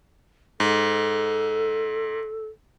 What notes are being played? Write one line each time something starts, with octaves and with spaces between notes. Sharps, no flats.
G#2 A4